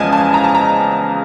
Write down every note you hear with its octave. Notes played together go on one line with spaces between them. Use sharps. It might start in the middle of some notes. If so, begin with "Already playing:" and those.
Already playing: E2 C#3 F3 G#3 D#5 G#5 A5
A5
A#5
A5
A#5